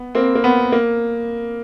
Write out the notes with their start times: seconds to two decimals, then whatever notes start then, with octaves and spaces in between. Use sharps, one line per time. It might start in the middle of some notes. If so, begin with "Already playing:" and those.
Already playing: B3
0.15 A#3 C4
0.35 A#3
0.44 B3
0.72 A#3